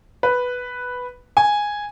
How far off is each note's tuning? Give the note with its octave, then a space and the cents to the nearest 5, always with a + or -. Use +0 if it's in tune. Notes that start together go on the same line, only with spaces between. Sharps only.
B4 +0
G#5 -5